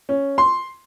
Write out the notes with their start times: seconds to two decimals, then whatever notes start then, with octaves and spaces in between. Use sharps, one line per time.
0.09 C#4
0.38 C6